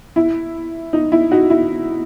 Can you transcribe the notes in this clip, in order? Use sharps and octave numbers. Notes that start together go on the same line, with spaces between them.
E4
D#4
E4
D#4 F#4
E4